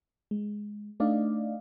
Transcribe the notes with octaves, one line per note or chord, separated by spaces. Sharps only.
G#3
A3 D4 D#4 D5 D#5 F5